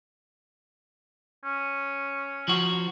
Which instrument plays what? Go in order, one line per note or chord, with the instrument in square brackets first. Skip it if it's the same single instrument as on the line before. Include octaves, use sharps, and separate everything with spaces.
[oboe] C#4
[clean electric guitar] F3 F#4